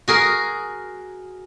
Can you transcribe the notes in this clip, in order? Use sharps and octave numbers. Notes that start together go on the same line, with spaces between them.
F#4 G#4 A#4